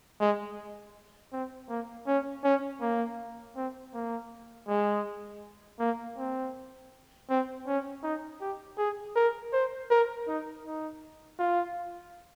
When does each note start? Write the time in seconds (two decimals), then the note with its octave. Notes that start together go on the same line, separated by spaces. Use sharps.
0.20 G#3
1.32 C4
1.69 A#3
2.07 C#4
2.44 C#4
2.81 A#3
3.56 C4
3.94 A#3
4.68 G#3
5.79 A#3
6.17 C4
7.29 C4
7.67 C#4
8.03 D#4
8.41 G4
8.78 G#4
9.16 A#4
9.53 C5
9.90 A#4
10.27 D#4
10.65 D#4
11.39 F4